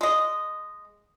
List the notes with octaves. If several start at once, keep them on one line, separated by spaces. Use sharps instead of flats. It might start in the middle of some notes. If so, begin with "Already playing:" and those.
G#3 D#5